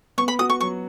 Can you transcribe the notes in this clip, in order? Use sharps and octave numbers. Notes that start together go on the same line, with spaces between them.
B3 C#6
B5
F#4 D#6
C#6
F#3 C#6